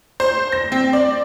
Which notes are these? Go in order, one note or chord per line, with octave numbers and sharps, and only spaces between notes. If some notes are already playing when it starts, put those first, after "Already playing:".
C5
A#6
C4
D5